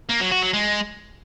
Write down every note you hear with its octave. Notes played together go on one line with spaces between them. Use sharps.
A#3
F#3
F#4
F#3
G#3